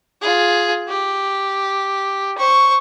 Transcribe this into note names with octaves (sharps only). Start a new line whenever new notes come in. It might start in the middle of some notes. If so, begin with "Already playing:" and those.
F4 G#4
G4
C5 C#6